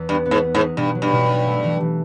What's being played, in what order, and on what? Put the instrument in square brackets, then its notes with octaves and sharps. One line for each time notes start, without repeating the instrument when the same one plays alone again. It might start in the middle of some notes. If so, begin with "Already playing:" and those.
Already playing: [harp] E2
[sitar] G2 [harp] B3
[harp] B3
[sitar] G#2
[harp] B3
[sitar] G#2
[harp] D#4
[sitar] G2 [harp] B2
[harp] F#3
[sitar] G2
[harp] B2
B3
A3
E3
E3